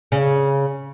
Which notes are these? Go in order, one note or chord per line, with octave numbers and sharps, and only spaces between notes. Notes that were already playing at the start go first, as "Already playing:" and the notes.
C#3